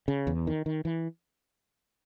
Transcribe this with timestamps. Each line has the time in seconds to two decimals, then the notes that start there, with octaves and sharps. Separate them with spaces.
0.08 C#3
0.27 E2
0.47 D#3
0.66 D#3
0.85 E3